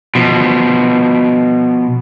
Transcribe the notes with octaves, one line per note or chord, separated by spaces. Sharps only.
B2 F3